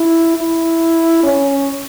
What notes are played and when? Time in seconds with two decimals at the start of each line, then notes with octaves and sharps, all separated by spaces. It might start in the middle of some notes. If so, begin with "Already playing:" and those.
Already playing: E4
0.36 E4
1.23 C#4